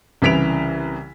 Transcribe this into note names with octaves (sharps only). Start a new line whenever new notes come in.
C2 C#3 E3 B6 D7 F7